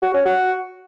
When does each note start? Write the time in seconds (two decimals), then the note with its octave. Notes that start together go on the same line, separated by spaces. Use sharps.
0.02 F#4
0.14 C#4
0.25 F#4